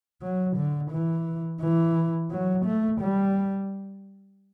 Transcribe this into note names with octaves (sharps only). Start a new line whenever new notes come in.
F#3
D3
E3
E3
F#3
A3
G3